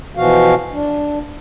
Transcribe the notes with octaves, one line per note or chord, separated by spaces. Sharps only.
B2 E3 F3 F#4 F5
D4